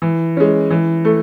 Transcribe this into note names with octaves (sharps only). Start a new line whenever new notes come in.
E3
G#3 C#4
E3
A3